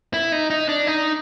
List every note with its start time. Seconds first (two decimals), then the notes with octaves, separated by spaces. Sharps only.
0.14 E4
0.32 D#4
0.50 D#4
0.69 D4
0.87 D#4